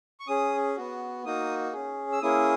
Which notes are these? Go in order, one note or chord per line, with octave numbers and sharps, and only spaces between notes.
C#6
C#4 G#4 D#6
B3 F#4
A#3 D#4 F#4 D#6
C#4 G#4
E6
A#3 C#4 E4 G#4 D#6